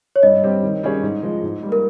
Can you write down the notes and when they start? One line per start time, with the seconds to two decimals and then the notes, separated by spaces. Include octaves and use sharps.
0.16 C#5
0.23 G2 D#5
0.43 G3 C4 G4
0.63 D#3
0.83 G3 C#4 G#4 C#5
1.03 G#2
1.23 F3 G#3 D#4
1.43 G#2
1.63 G3 A#3
1.72 A#4